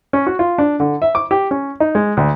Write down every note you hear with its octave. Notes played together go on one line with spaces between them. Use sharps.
C#4
F#4
F4
D4
D3
E5
D6
G4
C#4
D#4
G#3
D2